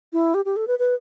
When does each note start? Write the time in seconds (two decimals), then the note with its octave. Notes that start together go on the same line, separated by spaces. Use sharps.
0.13 E4
0.34 G4
0.45 G4
0.56 A4
0.67 B4
0.79 B4